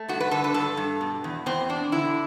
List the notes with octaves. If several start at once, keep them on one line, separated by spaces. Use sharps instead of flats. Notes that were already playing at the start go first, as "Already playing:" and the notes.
Already playing: A3
G2 F#4
B4
D3 A4
B4
G2 A4
G2
B2
E2
E2 C4
B2 D4
D3 E4